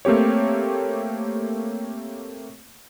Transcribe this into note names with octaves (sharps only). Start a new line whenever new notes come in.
A3 A#3 C4 G4 C#5